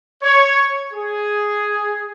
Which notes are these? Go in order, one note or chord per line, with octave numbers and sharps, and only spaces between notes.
C#5
G#4